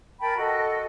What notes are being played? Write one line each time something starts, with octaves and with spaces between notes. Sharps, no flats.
A#4 G5 A5 B5
F#4 A4 D#5